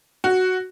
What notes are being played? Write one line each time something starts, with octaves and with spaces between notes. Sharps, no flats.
F#4